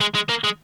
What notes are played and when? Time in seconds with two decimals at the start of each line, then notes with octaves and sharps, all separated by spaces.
0.01 G#3
0.15 G#3
0.29 A#3
0.44 G#3